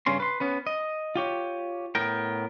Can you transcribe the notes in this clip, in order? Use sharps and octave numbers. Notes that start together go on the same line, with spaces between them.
G2 C#3 C#4 C6
B4 C6
B3 C#4 B4
D#5
F4 G4 C#5
A2 B3 A#4 G5